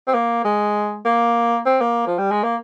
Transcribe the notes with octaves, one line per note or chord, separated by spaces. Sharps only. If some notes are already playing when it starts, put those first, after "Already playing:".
C4
A#3
G#3
A#3
C4
A#3
F3
G3
G#3
A#3